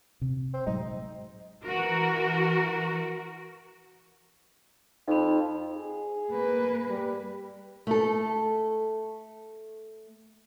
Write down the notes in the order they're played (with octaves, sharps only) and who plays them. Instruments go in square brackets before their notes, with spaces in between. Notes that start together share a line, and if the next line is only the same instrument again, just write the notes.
[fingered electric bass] C3
[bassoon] C4
[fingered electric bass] A2 F#3 G#3 [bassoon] D#4
[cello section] E3 F#4 A#4
[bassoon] F2 [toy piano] D#4 B5
[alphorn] G#4
[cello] A#3 B4
[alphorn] G3
[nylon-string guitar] A3 A4